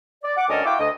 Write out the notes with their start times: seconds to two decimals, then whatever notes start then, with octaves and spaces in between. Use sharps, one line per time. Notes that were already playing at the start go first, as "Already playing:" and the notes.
0.24 D5
0.37 F#5 D6
0.49 D2 G3 C#4 A4 A#4 D#5
0.65 E4 F#4 F5 G5 D6
0.78 D2 D#5